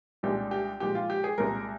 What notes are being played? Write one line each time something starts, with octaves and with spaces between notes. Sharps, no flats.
C2 A#2 G#3 D4 G4
G4
A#2 F3 G#3 G4
F4
G4
G#4
C2 A#2 G#3 A#4